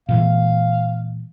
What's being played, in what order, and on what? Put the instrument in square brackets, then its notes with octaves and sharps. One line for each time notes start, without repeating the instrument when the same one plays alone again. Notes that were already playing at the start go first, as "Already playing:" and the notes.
[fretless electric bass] A#2 E3 G#3 [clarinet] F5